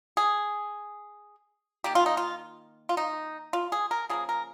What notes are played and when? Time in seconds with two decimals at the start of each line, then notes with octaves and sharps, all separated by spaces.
0.17 G#4
1.84 D#3 A#3 G4
1.95 F4
2.06 D#4
2.17 F4
2.89 F4
2.97 D#4
3.53 F4
3.72 G#4
3.91 A#4
4.09 C#3 F3 A#3 G#4
4.29 A#4